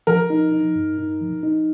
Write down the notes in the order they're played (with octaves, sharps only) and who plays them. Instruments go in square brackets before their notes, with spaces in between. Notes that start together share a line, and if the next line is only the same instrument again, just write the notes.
[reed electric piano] F3 [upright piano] A#4
[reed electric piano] D#4
D#4
G2
D#4
F3
D#4